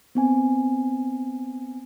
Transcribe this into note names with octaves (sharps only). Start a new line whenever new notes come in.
B3 C4 G#5